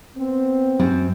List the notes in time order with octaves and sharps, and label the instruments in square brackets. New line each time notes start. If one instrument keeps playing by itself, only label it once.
[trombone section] B3 C4
[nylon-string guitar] F#2 C4